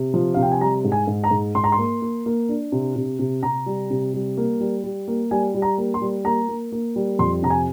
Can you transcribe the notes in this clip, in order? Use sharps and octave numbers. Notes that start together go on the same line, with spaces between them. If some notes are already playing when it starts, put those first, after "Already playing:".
Already playing: C3
F3
C3 F5
G5
G#5
G3 A#5
G#2
G#5
G#2
A#5
G#2
G#2 C6
A#5
C6
A#3
A#3
A#3
D4
C3
C3
C3
C3 A#5
G3
C3
G3
A#3
G3
G3
A#3
G3 G#5
G3
A#5
A#3
C6
G3
A#3 A#5
A#3
A#3
G3
F2 C6
C3 A#5
G#5